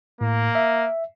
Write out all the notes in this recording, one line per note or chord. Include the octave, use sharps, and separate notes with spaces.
A2 A#3
E5